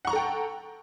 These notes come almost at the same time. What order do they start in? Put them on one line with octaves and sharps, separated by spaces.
F#5 C#6 A#5 A4 G5